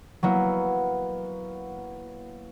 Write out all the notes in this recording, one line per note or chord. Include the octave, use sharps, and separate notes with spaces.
F#3 A#3 B3 E4